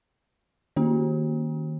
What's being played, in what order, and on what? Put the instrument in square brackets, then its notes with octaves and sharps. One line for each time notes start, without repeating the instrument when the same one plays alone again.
[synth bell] D#3 A#3 C#4 F#4